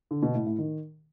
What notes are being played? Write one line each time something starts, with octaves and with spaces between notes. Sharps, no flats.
D3
B2
A2
A2
D#3